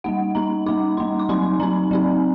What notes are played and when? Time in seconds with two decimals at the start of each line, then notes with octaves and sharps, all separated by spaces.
0.04 G3 A#3 D#4 F#5
0.35 G3 A#3 D#4 A#5
0.66 G3 A#3 D#4 D6
0.97 G3 A#3 D#4 C6
1.19 D6
1.29 F#3 C4 D#4 C6
1.60 F#3 C4 D#4 A#5
1.91 F#3 C4 D#4